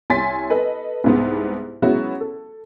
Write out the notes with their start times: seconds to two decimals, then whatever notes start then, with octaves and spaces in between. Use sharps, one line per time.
0.10 C2 C#5 G#5 C6 A6 B6
0.50 A4 B4 D#5
1.04 C2 G#2 B3
1.82 F#3 G#3 B3 C#4 E4 F#4
2.20 A4